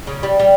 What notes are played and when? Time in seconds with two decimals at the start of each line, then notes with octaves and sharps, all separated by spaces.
0.07 C#3
0.23 G3
0.39 G3